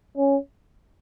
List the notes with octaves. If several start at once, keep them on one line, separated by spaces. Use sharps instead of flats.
C#4